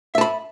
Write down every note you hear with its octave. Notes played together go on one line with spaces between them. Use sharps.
E5 A5 B5